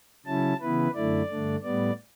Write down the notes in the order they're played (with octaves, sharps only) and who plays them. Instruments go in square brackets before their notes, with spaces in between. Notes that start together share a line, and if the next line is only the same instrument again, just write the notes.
[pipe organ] C#3 F#3 C#4 E4 A5
C#3 E3 B3 E4 B4
F#2 D3 A3 E4 D5
G2 D3 A3 D4
A2 G3 B3 D5